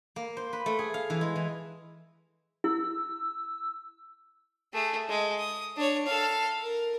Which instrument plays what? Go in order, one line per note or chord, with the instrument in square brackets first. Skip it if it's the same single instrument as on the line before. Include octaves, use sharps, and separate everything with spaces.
[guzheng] A#3
C5
B4
A3
G#4
F5
E3
G#3
E3
[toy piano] E4 [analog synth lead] E6
[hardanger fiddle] A3 G#4
G#3
D#6
D4 C#5
A4 F5
A#4